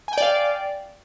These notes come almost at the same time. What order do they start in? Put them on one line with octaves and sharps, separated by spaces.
G#5 G5 D5 F5